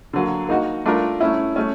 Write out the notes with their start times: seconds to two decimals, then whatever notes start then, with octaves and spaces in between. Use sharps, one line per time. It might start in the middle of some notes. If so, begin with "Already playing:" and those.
0.13 D3 F#3 A#3
0.49 A#3 D#4 F#4
0.86 A3 D4 F4 A#4
1.20 A3 C#4 E4
1.56 A3 C#4